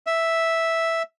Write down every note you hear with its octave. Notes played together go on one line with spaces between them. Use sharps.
E5